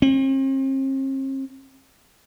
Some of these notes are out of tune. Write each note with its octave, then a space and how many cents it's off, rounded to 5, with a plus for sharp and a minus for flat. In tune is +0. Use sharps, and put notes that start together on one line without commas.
C4 +45